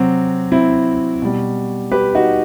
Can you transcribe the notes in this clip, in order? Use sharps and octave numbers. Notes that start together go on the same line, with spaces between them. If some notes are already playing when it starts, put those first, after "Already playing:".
Already playing: C3 F#3 C4
C4 E4
B2 G3
G4 B4
D#4 F#4